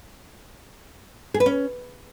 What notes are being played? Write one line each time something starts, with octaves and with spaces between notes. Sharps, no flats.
G#4
B4
C#4